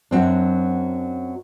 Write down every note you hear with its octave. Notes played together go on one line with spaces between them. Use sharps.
F#2 F#3 C4 D4